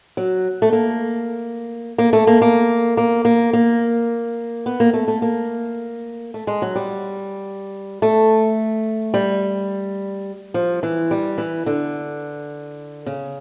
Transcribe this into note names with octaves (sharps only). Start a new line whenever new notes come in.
F#3
A3
A#3
A#3
A3
A#3
A#3
A#3
A#3
A#3
B3
A#3
A3
A3
A#3
A3
G#3
F#3
G3
A3
G3
F3
E3
G3
E3
D3
C#3